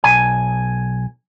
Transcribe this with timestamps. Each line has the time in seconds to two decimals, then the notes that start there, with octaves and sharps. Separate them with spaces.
0.04 B1 G#5